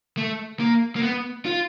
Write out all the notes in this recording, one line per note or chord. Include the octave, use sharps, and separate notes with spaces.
A3
A#3
A#3
B3
F4